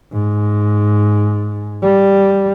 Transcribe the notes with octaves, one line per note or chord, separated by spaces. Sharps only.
G#2
G3